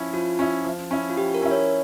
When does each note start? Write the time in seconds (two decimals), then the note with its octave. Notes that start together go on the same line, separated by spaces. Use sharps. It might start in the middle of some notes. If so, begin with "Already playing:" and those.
Already playing: F3 C#4 E4
0.13 F3 F4
0.39 C#4 E4
0.64 F3
0.91 C#4 E4
1.10 F4
1.17 F3 G4
1.35 A#4
1.43 C#4 E4
1.51 C#5